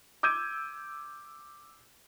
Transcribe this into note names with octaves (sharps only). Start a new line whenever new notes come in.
D6 E6 G6 G#6 D#7